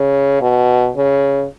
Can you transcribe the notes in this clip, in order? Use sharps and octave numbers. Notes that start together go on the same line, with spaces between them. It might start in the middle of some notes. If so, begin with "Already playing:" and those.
Already playing: C#3
B2
C#3